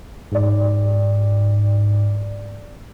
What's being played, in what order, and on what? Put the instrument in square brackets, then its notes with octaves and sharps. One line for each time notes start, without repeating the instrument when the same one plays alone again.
[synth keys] G#2 D5